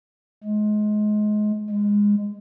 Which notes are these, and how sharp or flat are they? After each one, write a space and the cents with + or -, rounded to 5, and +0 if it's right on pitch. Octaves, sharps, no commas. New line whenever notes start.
G#3 +25
G#3 -15